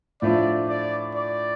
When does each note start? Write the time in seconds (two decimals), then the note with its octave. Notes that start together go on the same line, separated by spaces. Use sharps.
0.22 A2 F3 A3 D4 F4 D5
0.69 D5
1.15 D5